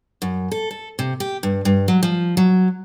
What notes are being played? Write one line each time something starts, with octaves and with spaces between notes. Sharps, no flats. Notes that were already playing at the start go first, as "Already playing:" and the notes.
F#2
A4
A4
C3
G4
G2
G2
F#3
F3
F#3